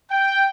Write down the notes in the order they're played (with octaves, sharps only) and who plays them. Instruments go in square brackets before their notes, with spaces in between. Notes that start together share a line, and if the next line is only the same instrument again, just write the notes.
[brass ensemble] G5